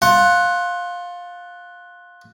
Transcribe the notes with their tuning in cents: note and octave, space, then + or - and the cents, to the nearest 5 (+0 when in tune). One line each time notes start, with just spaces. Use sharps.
F4 +15 F#5 +0